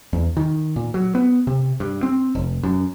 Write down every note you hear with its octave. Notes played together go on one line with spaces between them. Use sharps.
E2
D#3
A#2
F#3
B3
C3
G2
C4
F1
F#2